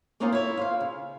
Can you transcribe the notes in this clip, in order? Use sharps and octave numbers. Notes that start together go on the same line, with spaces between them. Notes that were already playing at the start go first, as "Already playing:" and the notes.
A#3 C4 C#4 D#4 F4 A#4
E4 C#5
F4 C5 F5
C#3